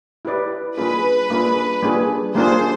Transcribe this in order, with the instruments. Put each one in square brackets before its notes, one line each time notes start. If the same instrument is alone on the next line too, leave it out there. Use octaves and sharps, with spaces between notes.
[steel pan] E4 G4 B4 D5
[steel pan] G3 A#3 D4 F4 G#4 [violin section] B4
[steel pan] G3 A#3 D4 F4 G#4
G3 A#3 D4 F4 G#4
[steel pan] G3 A#3 D4 F4 G#4 [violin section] C5